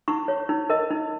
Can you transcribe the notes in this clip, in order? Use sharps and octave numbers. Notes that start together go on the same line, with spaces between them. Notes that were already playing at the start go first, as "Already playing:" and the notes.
D#4 C#6
C#5
D#4
A#4 D#5
D#4